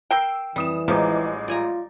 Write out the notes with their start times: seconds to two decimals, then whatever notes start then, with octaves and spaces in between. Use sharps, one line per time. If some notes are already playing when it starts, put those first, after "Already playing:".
0.11 A#4 G5 E6 C7 D7
0.56 F2 E3 G3 D#6 E7
0.88 A1 F3 G#3 D#4 D6
1.48 F4 D5 G#5 A#5